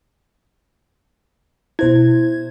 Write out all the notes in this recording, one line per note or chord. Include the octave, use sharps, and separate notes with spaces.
B2 E4 C5 G#6